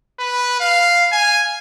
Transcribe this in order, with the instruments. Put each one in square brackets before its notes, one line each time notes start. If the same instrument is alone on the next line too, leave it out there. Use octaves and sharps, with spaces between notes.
[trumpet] B4
F5
G#5